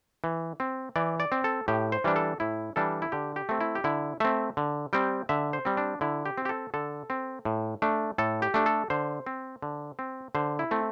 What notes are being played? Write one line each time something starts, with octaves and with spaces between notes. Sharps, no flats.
E3
C4
E3 D5
D5
C4
A4
A2 G4
C5
E3 G3 D4
A4
A2 E4
E3 G3 D4 A4
E4
D3 G4
G4
A3 C4
E4
G4
D3 E4
A3 C4 E5
D3
G3 C4 G5
D3 E5
C5
G3 C4
D4
D3 E4
G4
C4
G4
A4
D3 A4
C4
A2
A3 D4
A2 A4
G4
A3 D4
A4
D3 C5
C4
D3
C4
D3 C5
E4
A3 C4